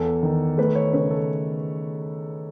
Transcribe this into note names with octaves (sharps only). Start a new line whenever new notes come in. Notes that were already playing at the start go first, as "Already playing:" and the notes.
Already playing: E2 A4
D#3
A3 B4
C#5
C#3 B4
A4